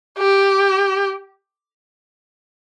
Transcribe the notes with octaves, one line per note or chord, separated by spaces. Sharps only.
G4